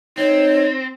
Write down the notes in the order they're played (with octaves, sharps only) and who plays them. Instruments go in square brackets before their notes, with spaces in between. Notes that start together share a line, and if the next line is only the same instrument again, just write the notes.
[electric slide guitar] C4 [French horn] D#4 [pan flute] C#5